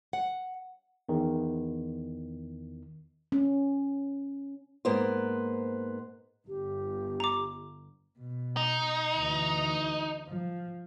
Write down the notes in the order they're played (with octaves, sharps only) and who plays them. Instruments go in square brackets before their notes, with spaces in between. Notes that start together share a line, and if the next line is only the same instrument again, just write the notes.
[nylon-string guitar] F#5
[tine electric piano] E2 D#3
[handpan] C#4
[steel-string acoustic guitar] G#2 A#3 B3 C5
[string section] G1 [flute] G4
[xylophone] A#5 D6
[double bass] B2
[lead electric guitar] D#4
[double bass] D2 E3
F3